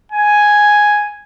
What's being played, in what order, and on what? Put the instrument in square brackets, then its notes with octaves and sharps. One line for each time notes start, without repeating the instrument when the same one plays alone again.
[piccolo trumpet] G#5